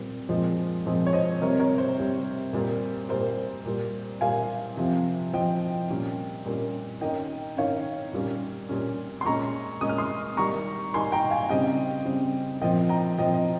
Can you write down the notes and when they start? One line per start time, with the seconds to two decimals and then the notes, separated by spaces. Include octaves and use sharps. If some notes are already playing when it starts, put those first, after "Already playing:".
Already playing: A#2 G3 C4
0.29 A#2 F3 G#3 C4
0.86 A#2 F3 G#3 C4
1.06 C#5
1.13 C5 D#5
1.41 C3 G3 C4 A#4 C#5
1.59 A#4 C#5
1.78 C5
1.98 C3 G3 C4
2.53 A#2 G3 A#3
3.09 A#2 G3 A#3 C5
3.66 A#2 G3 A#3
4.21 A#2 G3 A#3 F5 G#5
4.77 C3 F3 C4
5.33 C3 F3 C4 D#5 G5
5.90 A#2 G3 A#3 C#4
6.46 A#2 G3 A#3 C#4
7.01 D#3 A#3 C#4 D#5 G5
7.57 D#3 A#3 C#4 C#5 F5
8.13 A#2 G3 A#3 C#4
8.69 A#2 G3 A#3 C#4
9.21 C6
9.25 A#2 G#3 C#4 A#5 C#6
9.81 A#2 G#3 C#4 D#6
9.89 F6
9.98 C6 D#6
10.37 D#3 G3 A#3 A#5 C#6
10.94 D#3 G3 A#3 G#5 C6
11.12 G5 A#5
11.31 F5 G#5
11.49 C#3 G3 C4 D#5 G5
12.05 C#3 G3 C4
12.61 A#2 F3 C4 D#5 G5
12.89 G5 A#5
13.18 A#2 F3 C4 D#5 G5
13.34 D#5